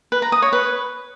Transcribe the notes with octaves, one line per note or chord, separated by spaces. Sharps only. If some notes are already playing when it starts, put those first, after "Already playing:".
B4
A#5
D#6
C#5
B4